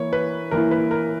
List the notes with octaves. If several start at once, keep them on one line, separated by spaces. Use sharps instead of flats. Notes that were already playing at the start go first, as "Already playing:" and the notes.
Already playing: E3 A#3 E4 C#5
B4
E3 A#3 E4 A#4
B4
A#4